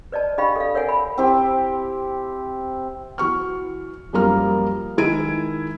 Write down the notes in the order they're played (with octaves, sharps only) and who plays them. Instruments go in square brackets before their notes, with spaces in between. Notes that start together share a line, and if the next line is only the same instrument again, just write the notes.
[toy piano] B4 D5 D#5 A5
D4 G4 D#5 F5 G5 B5
A4 D5 F5
A#4 C#5 E5 F#5 G#5
B5
[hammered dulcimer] C4 E4 G4
[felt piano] E3 F#4 C#6 F6
F#2 F3 G3 A#3 A#5 F6
D#3 G#3 E4 G#6 D7 D#7